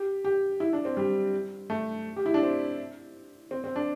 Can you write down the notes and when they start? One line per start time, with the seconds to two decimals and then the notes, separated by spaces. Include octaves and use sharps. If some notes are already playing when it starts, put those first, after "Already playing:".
Already playing: G4
0.25 G4
0.60 E4
0.73 D4
0.85 C4
0.97 G3
1.70 A3
2.16 G4
2.26 E4
2.34 D4
2.43 C4
3.51 C4
3.64 C4
3.76 D4